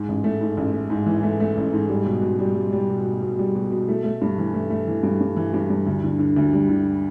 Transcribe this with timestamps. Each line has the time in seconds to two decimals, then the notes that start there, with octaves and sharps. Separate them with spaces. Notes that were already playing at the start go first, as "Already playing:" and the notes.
Already playing: G#2
0.08 A1
0.24 A3
0.41 G#2
0.57 A1
0.73 A3
0.90 G#2
1.06 E3
1.23 A3
1.40 A3
1.57 A1
1.73 G#2
1.89 G3
2.06 B2
2.22 B2
2.39 G3
2.55 G3
2.73 G3
2.89 B2
3.05 B2
3.22 B2
3.39 G3
3.56 B2
3.72 B2
3.89 A3
4.04 A3
4.22 G2
4.38 E3
4.54 A3
4.70 A3
4.87 E3
5.03 G2
5.21 G2
5.37 E3
5.54 G2
5.70 G2
5.87 D2
6.03 D3
6.19 D3
6.36 D2
6.53 G3
6.69 D3